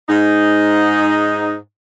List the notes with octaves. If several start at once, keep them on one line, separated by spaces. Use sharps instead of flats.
G#2 D#4